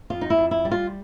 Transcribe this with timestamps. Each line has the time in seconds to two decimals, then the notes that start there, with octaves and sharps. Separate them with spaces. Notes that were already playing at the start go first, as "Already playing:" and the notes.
0.10 F2 F4
0.21 D#4
0.30 E4
0.37 F2
0.51 E4
0.65 G3
0.71 F4